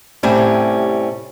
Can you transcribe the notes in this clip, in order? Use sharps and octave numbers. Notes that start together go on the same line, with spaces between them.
A2 C3 G3 C#4